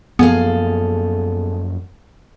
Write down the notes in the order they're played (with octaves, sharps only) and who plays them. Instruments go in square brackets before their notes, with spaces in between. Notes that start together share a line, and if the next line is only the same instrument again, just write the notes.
[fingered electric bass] F#2 F3 A#3 [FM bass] B3 [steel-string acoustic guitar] G#4 A4 F5